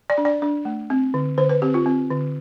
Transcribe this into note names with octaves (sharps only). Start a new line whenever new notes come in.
D5
D4
D5
D4
A3
C4
D3
D3 C5
B4
C4 G4
F4
C4
D3